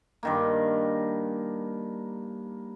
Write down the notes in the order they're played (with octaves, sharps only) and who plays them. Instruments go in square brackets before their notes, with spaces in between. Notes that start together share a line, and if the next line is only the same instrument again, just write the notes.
[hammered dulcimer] G2 D#3 A#3